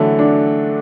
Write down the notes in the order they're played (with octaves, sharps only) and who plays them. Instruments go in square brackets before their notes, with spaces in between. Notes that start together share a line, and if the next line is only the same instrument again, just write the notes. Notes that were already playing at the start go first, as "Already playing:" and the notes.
Already playing: [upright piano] D3 A3 [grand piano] E3 F#3
[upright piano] D4